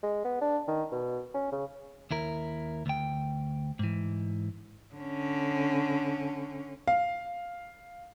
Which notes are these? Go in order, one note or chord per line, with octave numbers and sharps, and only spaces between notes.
G#3
B3
D4
D#3
B2
C#4
C#3
D#2 E4 A#4
D2 G5
G#2 E3
D3 C#4
F5